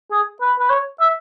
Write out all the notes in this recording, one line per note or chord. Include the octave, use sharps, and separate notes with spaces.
G#4
B4
B4
C#5
E5